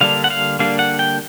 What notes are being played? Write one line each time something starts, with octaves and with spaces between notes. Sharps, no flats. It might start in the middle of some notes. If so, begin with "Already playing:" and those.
D3 G3 A#3 D4 F5
F#5
F5
D3 G3 A#3 D4 F5
F#5
G5